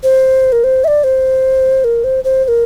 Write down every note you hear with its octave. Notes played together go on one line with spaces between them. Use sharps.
C5
A#4
C5
E5
D5
C5
A#4
C5
C5
C5
A#4